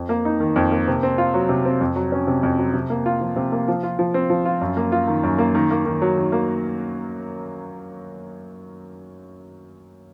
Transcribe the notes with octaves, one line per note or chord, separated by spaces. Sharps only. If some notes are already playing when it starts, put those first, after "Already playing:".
Already playing: F2
A#3
D#4
D#3
F2
A#3
C3
C4
F4
F#3
C3
C4
F2
F#3
C#4
C3
F2
F#3
C3
A#3
F4
F3
C3
A#3
F3
F4
F3
C4
F3
F4
F#2
A#3
F4
D#3
F#2
A#3
D#3
A#3
D#3
F#3
D#3
A#3